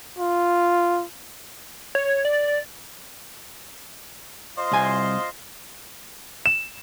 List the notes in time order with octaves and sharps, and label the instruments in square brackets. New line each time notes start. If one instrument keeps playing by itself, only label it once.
[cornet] F4
[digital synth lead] C#5
D5
[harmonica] F4 C5 D#5
[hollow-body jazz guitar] C2 G#5
[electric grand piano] E7